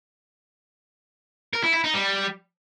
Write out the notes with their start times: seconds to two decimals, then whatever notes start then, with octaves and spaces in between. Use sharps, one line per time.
1.53 A#4
1.64 E4
1.74 E4
1.84 D#4
1.94 G3